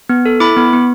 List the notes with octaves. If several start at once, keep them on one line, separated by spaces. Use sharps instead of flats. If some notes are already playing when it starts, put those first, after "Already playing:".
B3
A4
E4 B5 D6
B3
B3